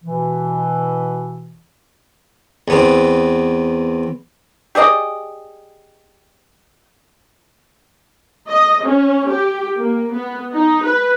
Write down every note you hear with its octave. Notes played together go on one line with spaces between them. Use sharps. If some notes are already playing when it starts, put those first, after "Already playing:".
B2 E3
E2 B3 C4
G4 G#4 D5 D#5
D#5
C#4
G4
A#3
B3
D#4
B4